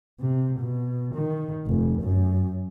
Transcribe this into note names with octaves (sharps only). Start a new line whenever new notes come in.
C3
B2
D#3
F1
F#2